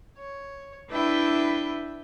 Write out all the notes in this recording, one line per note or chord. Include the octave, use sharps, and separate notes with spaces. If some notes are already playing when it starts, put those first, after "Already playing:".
C#5
D4 E4 B4 E5 G5 B5